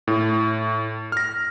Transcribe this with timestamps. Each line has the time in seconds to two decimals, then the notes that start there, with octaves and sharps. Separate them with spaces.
0.07 A2
1.12 F6 A#6